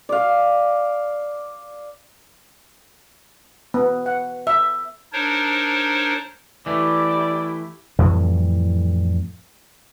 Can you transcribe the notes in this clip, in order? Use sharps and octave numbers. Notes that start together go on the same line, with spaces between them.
D5 F5
B3
F#5
E5
D4 D#4 A#4 C5 C#5
E3 A3 E4 G4 D5
F2 A2 E3 G3